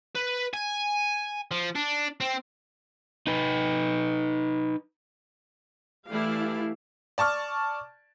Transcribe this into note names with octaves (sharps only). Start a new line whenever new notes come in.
B4
G#5
F3
D4
C4
D#4 B4
E3 A3 E4 G4 D5 F5
D5 A5 C#6 F6